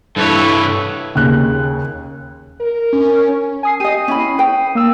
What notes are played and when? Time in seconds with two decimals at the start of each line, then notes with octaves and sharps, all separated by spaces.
0.17 G2 E4 A4 B4 C#5
1.15 D#2 C#3 F#6
2.60 A#4
2.93 C#4
3.63 G#5 D#6 C7
3.80 G4 D#5 D#6 C7 D#7
4.08 C#4 E4 B5
4.38 B4 G5
4.75 A#3 E6